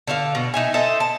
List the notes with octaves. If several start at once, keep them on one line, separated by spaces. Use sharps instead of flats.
D3 A4 C#5 F5
B2
D#4 E5 G#5
A4 C5 D#5 E5
A5